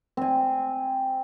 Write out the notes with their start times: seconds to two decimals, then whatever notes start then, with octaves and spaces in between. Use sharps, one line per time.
0.17 C4 G#5